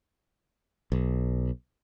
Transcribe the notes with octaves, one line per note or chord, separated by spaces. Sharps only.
B1